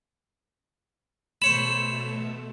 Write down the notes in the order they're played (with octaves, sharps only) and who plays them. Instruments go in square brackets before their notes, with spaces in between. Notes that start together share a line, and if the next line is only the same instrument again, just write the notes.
[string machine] B2 A3 [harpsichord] C5 C#5 B5 [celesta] E7